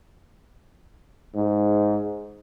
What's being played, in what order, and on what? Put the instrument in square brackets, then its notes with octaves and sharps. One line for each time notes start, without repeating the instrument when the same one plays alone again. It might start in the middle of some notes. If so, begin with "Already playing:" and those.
[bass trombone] G#2